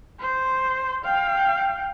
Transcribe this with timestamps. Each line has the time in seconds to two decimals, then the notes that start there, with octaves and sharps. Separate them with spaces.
0.20 C5
1.05 F5 G5